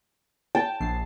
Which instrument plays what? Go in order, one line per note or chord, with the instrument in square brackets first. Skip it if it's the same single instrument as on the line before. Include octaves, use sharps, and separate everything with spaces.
[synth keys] G5 [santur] A5
[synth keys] A#1 C7